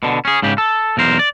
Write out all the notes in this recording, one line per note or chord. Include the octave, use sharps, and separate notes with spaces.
B2 D3
C#4 G#4
G#2 C#3 G4
A4
B1 E2 A#4 C5
D5